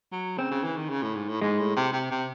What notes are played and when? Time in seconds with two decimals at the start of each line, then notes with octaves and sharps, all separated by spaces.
0.12 F#3
0.38 C#3 C4
0.51 C#3
0.64 E3
0.77 D#3
0.89 C#3
1.03 A2
1.16 G#2
1.29 A2
1.41 G#2 G#3
1.59 A2
1.77 C3
1.93 C3
2.11 C3